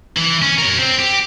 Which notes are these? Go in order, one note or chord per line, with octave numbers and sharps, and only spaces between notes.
E3
C#4
A#4 C#5
C4
G4